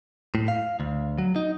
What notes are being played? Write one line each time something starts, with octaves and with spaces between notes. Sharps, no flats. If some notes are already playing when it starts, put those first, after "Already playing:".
A2
F5
D2
F#3
D#4